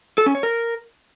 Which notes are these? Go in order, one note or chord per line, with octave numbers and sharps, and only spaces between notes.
A4
C#4
C#5
A#4